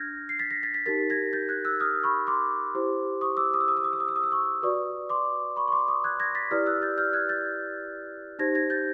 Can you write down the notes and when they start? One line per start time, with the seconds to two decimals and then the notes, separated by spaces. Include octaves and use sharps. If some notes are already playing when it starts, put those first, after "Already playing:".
Already playing: D4 F6 G6 G#6 A#6
0.29 C7
0.39 A6 B6
0.51 A#6 C7
0.63 A6 B6
0.74 A6 B6
0.86 D#4 G4 A#4 A6 B6
1.10 G#6 A#6
1.33 G6 A6
1.49 F#6 G#6
1.65 E6 F#6
1.80 D#6 F6
2.04 B5 C#6
2.27 C6 D6
2.75 E4 G4 C5
3.21 C#6 D#6
3.37 D6 E6
3.54 D#6
3.61 E6
3.68 D#6
3.77 E6
3.84 D#6
3.93 E6
4.00 D#6
4.08 E6
4.16 D#6
4.23 E6
4.31 C#6 D#6
4.63 F#4 B4 D5 C#6 D#6
5.09 C6 D6
5.56 B5 C#6
5.68 C#6
5.72 C6 D6
5.88 C#6 D#6
6.04 F#6 G#6
6.20 G#6 A#6
6.35 A6 B6
6.51 E4 G4 B4 D5 D#6 F6
6.66 E6 F#6
6.82 G6 A6
6.98 F6 G6
7.13 F#6 G#6
7.29 G6 A6
8.39 D#4 G4 C5 G#6 A#6
8.55 G#6 A#6
8.70 G6 A6